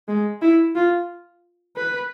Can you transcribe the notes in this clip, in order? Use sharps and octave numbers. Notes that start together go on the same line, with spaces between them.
G#3
E4
F4
B4